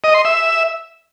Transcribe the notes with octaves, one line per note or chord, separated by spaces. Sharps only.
D#5
C6
E5